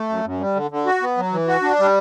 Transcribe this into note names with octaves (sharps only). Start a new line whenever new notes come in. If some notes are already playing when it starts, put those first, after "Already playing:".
Already playing: A3
F#2
F#2
G3
D3
D3
F#4
B3
F#3
E3
F#4
D4
G3